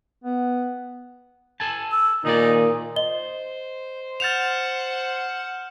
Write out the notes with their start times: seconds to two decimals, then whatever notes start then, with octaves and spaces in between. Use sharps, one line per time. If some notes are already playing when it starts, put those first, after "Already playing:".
0.24 B3
1.60 A4 G#5 A5
1.92 E6
2.25 A#2 D#3 D#4 G#4 D5
2.96 C5 D#5 G7
4.20 F#5 F6 G6 A6 E7 F7